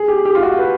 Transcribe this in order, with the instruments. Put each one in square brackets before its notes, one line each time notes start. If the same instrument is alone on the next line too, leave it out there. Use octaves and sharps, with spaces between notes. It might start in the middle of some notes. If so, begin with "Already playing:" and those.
Already playing: [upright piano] G#4
G4
G4
F4
F#4
B4